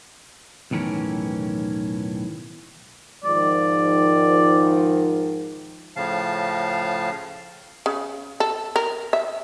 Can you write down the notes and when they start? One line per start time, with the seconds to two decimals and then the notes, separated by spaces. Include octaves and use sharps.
0.71 B1 E2 A2 D#3 E3 C#4
3.24 G#2 D#3 F3 D5
5.96 A2 C#3 F3 F5 A5
7.86 C#3
8.40 A4
8.76 A#4
9.13 E5